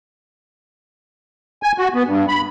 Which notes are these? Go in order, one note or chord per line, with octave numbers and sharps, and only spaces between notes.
G#5
F#4
B3
G2
B5